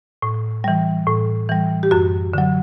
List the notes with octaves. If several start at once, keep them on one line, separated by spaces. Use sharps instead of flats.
A2
E3 G3
A2
E3 G3
G4
F#2 F#4
D3 F#3